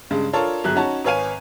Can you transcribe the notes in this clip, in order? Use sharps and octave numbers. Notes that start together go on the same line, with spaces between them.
G2 C#3 G#3
D4 F4 A4 A#4 C#5 A5
G1 F#3 G#4 F#6
C#4 D#4 F#4 C#5 A5 A#5
G#1 B4 C#5 F5 G#5 D#7